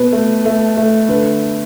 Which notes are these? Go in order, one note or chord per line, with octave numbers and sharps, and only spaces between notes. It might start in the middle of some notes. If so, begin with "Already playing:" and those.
Already playing: B2 B4
A3
A3
A3
D3 B4